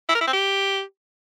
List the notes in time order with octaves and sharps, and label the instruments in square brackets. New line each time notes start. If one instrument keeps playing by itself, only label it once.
[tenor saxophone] E4
A#4
E4
C4
G4